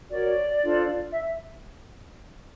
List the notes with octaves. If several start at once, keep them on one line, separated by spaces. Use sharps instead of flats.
F#4 A#4 C#5 D5
D4 F4 A4 C5
E5